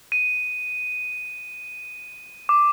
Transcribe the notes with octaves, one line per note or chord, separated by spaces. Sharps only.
D#7
D6